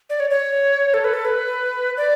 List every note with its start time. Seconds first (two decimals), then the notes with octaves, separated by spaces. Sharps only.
0.10 D5
0.20 C#5
0.30 C#5
0.94 A4
1.04 B4
1.13 A4
1.25 B4
1.97 D5